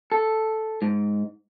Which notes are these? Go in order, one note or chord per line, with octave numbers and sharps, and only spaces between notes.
A4
G#2